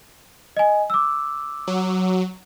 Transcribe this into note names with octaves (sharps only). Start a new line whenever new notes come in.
D#5 G#5
D6 E6
F#3